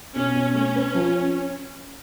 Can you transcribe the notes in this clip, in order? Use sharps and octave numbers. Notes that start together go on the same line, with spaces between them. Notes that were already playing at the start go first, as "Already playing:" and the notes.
B2 C#4
B2
A3 C#4
B4
F3